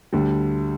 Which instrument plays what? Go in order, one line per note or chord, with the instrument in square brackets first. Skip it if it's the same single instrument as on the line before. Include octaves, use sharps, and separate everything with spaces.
[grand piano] D2 D3 G3